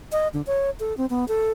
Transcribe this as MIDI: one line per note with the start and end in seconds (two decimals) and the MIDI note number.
0.12 0.28 75
0.34 0.42 50
0.47 0.70 73
0.80 0.96 69
0.97 1.06 60
1.10 1.27 59
1.28 1.52 69